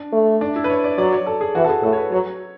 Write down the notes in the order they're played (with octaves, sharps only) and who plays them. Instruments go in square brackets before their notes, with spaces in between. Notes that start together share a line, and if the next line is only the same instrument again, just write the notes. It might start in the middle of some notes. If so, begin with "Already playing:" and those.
Already playing: [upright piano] D4
[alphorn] A3
[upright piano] D4
E4
B4
C#5
D5
[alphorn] F#3 [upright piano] D5
[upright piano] C#5
A4
G#4
[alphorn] E3 [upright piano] F#4
[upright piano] A4
G#4
[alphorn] A2 [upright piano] A4
[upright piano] C#5
B4
[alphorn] F#3 [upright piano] C#5